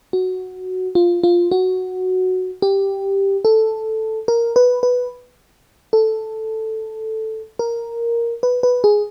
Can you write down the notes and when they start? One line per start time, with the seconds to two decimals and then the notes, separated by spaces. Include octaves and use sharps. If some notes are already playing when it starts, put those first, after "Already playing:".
0.13 F#4
0.95 F4
1.23 F4
1.51 F#4
2.62 G4
3.45 A4
4.28 A#4
4.56 B4
4.83 B4
5.93 A4
7.59 A#4
8.43 B4
8.63 B4
8.84 G#4